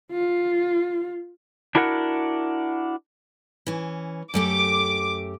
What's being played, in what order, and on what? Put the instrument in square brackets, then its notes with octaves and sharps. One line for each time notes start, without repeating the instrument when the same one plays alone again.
[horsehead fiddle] F4
[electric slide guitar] D4 E4 F#4 A#4 C#5 F#5
[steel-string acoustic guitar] E3 C#4
[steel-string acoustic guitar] F#2 A3 G4 [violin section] D6